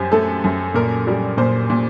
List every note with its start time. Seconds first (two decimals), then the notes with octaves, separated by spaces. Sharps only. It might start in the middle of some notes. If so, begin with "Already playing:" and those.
Already playing: F#2 G4 C5
0.12 A3 A4
0.44 F#2
0.74 A#2 A#4
1.07 G3
1.37 A#2 C5
1.70 A#2